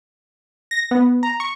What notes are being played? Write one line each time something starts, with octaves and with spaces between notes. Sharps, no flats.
A#6
B3
A#5
C#6